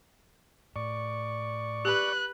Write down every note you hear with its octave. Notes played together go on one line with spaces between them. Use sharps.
A2 D5 C#6
G4 B4 F#6